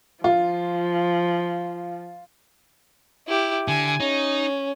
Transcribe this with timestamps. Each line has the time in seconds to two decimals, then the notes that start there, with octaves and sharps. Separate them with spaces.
0.24 F3 F4
3.28 E4 G4
3.68 D3 G#5
4.00 C#4 D#4